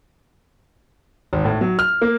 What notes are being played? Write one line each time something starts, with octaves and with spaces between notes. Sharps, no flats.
G#1
A2
F#3
F6
A#3